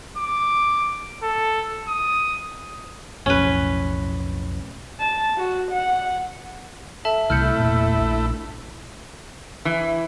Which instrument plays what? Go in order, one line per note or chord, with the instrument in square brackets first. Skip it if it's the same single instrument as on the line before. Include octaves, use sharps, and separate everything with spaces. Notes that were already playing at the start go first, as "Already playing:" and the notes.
[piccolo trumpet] D6
A4
D#6
[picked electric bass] B1 F2 A2 [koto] C#4 B4
[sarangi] A5
F#4
F#5
[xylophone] A4 E5 A5
[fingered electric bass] C2 C3 [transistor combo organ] A3 E4 [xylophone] F6 G6 C#7
[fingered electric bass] E1 A#2
A#1
[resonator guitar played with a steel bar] E3